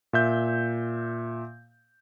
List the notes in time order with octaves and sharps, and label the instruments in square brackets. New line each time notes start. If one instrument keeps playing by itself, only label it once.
[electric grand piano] A#2 E5 G6